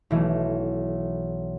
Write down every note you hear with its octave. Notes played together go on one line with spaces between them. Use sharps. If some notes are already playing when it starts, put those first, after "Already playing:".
B1 E3 A3